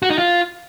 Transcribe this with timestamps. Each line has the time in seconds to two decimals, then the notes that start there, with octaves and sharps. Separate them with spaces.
0.02 F#4
0.10 D#4
0.18 F4